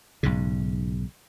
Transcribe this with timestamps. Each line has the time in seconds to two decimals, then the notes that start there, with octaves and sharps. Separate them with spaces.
0.23 B1 G#2 C#3